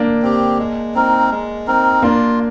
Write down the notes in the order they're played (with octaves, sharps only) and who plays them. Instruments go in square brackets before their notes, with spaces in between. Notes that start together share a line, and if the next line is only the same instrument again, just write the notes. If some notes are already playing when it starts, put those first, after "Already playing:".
Already playing: [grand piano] A#3 D4
[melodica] C4 G4
G#3
C4 D#4 A#4
G#3
C4 D#4 A#4
[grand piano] A#3 D4 [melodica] F4